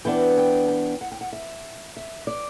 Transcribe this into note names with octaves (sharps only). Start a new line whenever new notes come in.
E3 B3 D4 G5
G5
G5
F#5
G5
F#5
E5
E5
D5